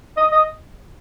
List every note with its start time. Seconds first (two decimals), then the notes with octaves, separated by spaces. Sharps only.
0.17 D#5
0.32 D#5